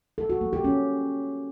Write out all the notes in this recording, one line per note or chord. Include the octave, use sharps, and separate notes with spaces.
A4
F#4
A#3
G4
C#4